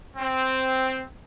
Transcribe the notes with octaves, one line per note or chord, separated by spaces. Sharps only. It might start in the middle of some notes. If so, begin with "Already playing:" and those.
C4